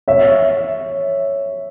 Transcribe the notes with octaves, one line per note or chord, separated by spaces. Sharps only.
C#5 E5